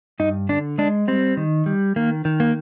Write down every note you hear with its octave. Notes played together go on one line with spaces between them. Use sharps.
G2 D#4
D3 D4
G#3 D4
G3 C4
D#3
G3
D#3 A#3
D#3
A#3